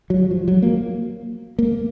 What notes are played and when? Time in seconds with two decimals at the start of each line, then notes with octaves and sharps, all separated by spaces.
0.10 F#3
0.31 F3
0.48 F#3
0.62 A#3
1.59 A#3